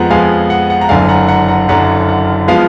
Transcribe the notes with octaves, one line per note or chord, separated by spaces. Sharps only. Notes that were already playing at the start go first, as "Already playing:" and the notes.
Already playing: F2 F3 G#3 B3 F#5 A#5
F2 F3 G#3 B3 F5 G#5
F#5
F#5
A#5
F#1 F#2 D3 F5 G#5
F#5 A#5
F#5 A#5
F#5 A#5
F#1 F#2 D3 F#5 A#5
F#5
F3 G#3 B3 F5